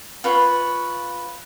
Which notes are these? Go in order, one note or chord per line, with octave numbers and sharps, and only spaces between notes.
F4 B4 C#5